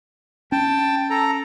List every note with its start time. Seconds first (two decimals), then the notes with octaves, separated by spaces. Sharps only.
0.52 C#4 G5 A5
1.10 A4 A#5